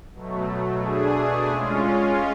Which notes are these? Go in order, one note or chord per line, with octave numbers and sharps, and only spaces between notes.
B2 F#3 A3
B2 A3 D4 G#4
G#3 C#4 F4